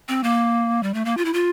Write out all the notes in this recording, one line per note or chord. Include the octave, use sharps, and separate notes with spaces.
C4
A#3
G3
A3
A#3
F4
E4
F4